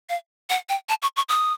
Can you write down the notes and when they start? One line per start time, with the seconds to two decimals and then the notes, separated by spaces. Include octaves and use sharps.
0.09 F5
0.50 F#5
0.69 G5
0.89 A5
1.02 C#6
1.16 C#6
1.29 D#6